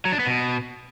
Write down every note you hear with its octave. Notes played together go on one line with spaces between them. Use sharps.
F#3
D4
B3
B2